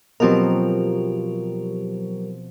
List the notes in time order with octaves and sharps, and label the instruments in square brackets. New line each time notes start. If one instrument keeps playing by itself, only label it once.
[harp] B2 F3 C4 [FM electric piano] F#3 G4 A#4